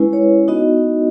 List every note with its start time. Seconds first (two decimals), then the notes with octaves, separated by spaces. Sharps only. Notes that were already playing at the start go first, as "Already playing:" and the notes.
Already playing: G#3 C#4 E4 B4
0.13 C#5
0.48 B3 D#4 F#4 D#5